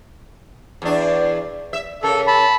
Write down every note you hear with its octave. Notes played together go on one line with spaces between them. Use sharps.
E2 D4
E5
C#3 A4 A#4
A5 B5